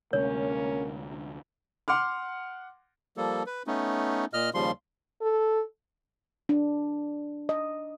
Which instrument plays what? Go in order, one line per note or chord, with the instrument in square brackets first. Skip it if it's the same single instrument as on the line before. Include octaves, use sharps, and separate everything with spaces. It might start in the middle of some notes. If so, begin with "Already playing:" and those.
[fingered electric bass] D2 C3 G#3 [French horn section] A#3 C#4 A#4 [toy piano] C#5
[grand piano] F#5 C6 D6 F6
[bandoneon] F3 G3 A#3 A4
B4
A3 B3 C#4 D#4
A#2 D#5 F6
D#2 C#3 F3 G3 C6
[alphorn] A4
[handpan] D4
D#5